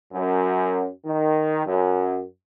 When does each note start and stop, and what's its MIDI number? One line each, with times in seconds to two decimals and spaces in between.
0.12 0.89 42
1.06 1.65 51
1.67 2.24 42